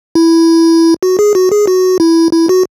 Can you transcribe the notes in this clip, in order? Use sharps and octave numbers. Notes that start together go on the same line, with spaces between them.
E4
F#4
G#4
F#4
G#4
F#4
E4
E4
F#4